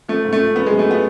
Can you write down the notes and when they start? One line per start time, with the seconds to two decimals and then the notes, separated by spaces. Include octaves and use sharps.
0.09 F3 A3
0.25 G#2
0.33 A3
0.40 F3
0.55 F3 B3
0.66 F#2 G#3
0.79 A3
0.87 F3 B3